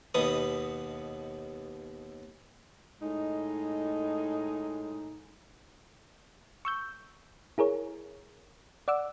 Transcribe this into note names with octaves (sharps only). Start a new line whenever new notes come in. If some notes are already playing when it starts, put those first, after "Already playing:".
D#2 B2 B3 B4 D#6
A2 G#3 D#4
C#6 E6 G6
E4 G#4 A#4 C#5
D5 F#5 D6 E6